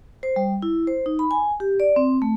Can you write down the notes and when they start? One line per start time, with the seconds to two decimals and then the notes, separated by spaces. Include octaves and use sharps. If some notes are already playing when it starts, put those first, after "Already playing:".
0.23 C5
0.36 G3
0.62 E4
0.87 C5
1.06 D#4
1.19 B5
1.31 G#5
1.60 G4
1.80 D5
1.96 C4
2.22 A3